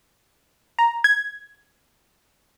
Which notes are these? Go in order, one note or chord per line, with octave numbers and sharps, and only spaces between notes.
A#5
G#6